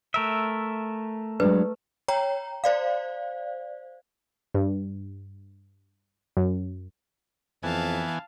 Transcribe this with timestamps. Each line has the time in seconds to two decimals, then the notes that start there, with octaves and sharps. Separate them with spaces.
0.14 A3 A#4 E5
1.40 F#3 G#3 D4 B4
2.08 C#5 G5 A#5
2.64 C5 D5 F5
4.55 G2
6.37 F#2
7.63 F2 E3 B3 F5 G#5 A5